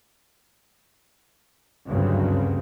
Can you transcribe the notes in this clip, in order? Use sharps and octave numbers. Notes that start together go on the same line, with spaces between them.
F#1 D2 G2 C#3 F#3 C4